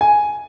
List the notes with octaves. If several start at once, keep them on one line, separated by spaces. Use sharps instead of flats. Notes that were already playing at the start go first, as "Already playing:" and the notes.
G#5